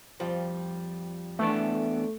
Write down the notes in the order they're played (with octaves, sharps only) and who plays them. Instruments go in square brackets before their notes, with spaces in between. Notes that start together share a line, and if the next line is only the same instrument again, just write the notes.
[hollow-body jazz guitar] F2 F3 G3
[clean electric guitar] E2 B3 D4 [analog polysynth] A3